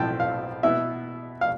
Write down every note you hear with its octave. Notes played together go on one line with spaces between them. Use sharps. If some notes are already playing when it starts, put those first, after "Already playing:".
Already playing: B1 A2 F3 C4 E4 G5 A5
F5
B2 B3 E4 E5
F5